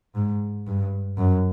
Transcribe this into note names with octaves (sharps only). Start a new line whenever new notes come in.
G#2
G2
F#2